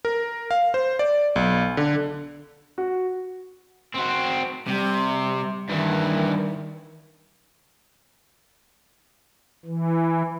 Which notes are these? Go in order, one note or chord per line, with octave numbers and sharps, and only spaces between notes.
A#4
F5
C5
D5
B1
D3
F#4
C4 F#4
C3 G3
G2 D#3 E3
E3